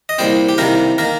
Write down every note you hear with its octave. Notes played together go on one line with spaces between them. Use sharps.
D#5
C2 A#2 G3 C4 C5
G4
C2 C3 D#3 G3 A#3 A#4
D#3 A#3 A#4